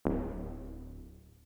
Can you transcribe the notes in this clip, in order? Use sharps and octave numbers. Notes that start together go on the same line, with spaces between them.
D1